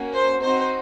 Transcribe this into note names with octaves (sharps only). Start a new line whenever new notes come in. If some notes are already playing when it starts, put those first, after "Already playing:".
Already playing: A#3 C#4 F#4
C5
C4 D#4 F#4 C5